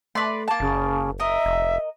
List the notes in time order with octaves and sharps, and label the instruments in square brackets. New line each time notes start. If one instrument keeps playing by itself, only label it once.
[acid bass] A3 [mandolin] B4 D5 C6
[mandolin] A#3 A5
[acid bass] F#1 [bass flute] C#3
[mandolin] A#4 D#5 [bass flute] E5
[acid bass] F1